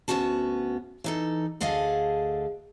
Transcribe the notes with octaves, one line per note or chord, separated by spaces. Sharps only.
D2 B3 C#4 F#4 A5
E3 D#4 A4
D2 D3 G#4 A4 D#5 F5